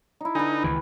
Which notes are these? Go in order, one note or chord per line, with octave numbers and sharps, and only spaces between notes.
D#4 E4
D3 D#4 B4 G#5
C#2 D#3 E3